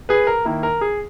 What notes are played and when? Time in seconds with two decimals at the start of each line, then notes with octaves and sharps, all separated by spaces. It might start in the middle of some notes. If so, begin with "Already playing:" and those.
0.09 G#4 B4
0.27 A#4
0.45 D#3 A#3 E4
0.63 A#4
0.81 G#4